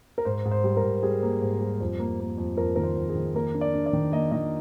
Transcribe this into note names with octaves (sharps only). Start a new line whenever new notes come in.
A#4
G#2 C5
G#2
C5
G3
A#4
G#2
G3 G#4
A#3
G#2
G3
F2
A#3
A#3
F2
F2 A#4
D#3 A#4
C5
F2
G#4
D#3
A#3 A#4
D4
D5
D4
D5
D#3
A#3 D#5
D#3 D#5